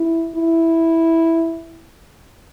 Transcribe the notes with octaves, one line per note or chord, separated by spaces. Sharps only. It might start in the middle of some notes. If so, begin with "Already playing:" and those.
Already playing: E4
E4